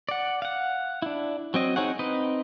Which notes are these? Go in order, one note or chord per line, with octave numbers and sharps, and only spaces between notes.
D5 F#5
F5 F#5
D4 E4
F#3 C4 D#5
C4 D#4 G#4 C#5 F#5
C4 D#4 B4 D#5